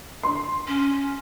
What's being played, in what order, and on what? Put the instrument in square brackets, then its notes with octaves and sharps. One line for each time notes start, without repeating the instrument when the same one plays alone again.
[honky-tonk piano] C6
[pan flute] C#4